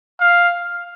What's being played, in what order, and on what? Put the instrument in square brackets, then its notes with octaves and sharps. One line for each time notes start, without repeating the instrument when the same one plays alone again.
[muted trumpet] F5